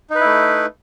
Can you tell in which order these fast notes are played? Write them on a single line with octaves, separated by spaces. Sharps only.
D#4 B4 E4 A3